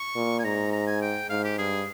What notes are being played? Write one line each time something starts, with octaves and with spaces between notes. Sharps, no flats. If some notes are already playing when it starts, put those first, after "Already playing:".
Already playing: C#6
A#2
G#5
G#2 A#5
A#5
G#5
G5
G#2 F5
G4
G2 G#4